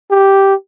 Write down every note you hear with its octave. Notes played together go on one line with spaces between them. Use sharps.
G4